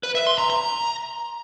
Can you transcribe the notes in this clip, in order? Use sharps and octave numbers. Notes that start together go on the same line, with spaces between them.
B4
E5
C6
A#5
A#5